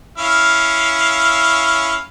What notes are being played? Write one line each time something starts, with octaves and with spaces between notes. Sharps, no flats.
C#4 E4 F5